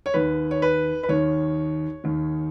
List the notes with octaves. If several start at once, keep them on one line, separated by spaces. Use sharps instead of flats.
C#5
D#2 D#3 B4
C#5
B4
B4
D#2 D#3 C#5
D#2 D#3